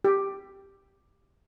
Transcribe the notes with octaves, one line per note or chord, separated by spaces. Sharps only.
G4